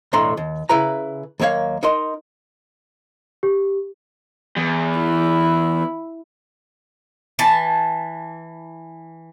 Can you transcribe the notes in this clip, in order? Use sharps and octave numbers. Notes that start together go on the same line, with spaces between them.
B1 E2 A2 D4 A#5 C6
D#2
C#3 E4 B4 A#5
D#2 F#3 A#3 C#5 F5
D#4 A#4 D#5 C6
G4
E2
E4
E3 A5